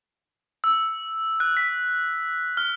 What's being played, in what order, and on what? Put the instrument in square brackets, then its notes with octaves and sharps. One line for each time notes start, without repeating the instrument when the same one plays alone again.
[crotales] E6
F#6
B6
F6